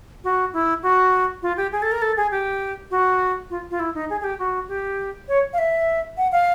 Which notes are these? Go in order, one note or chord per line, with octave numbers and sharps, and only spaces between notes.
F#4
E4
F#4
F4
G4
G#4
A4
A#4
A4
G#4
G4
F#4
F4
F4
E4
D#4
G#4
G#4
G4
F#4
G4
C#5
F5
E5
F#5
F5